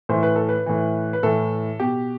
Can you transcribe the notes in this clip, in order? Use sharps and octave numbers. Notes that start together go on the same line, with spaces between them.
A2 E3 C5
B4
A4
B4
A2 E3
B4
A2 E3 A4
B2 G4